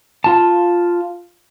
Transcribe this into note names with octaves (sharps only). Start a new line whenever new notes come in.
F4 A5